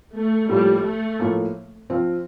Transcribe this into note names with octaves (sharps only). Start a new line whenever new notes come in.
A3
A2 F3 G3 A#3
A3
A2 F3 A#3
F3 C4 F4